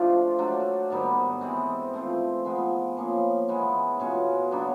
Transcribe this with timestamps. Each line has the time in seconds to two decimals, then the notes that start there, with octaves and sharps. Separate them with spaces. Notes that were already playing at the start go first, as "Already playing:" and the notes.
Already playing: F3 A3 D4 F4
0.38 F#3 A3 D4
0.90 G#2 D#3 G3 B3
1.41 E3 G#3 C4
1.94 F3 A3 C4
2.45 F3 G#3 B3
2.97 F3 A#3 C#4
3.48 E3 G#3 B3
4.00 B2 G#3 C#4 F4
4.51 C#3 F#3 B3 D4